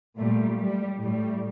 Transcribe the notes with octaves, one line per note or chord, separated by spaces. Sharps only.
A#2 G3 A3
G3
A2 G3